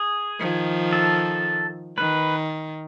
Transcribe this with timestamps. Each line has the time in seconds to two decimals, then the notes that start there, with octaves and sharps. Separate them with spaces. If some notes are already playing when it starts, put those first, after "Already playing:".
Already playing: G#4
0.40 D#3 F3
0.93 A4
1.98 D#3 B4